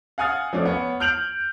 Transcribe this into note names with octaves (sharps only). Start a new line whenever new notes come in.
F5 F#5 G#5 D#6 F6 A6
F3 A3 C#4 D5
B3 C#5
F6 G6 D7 F7 F#7